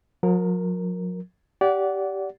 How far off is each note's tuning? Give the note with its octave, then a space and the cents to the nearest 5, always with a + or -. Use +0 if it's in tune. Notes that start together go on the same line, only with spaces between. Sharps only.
F#3 -45 A#4 +0
G4 -10 D5 -25 F#5 +0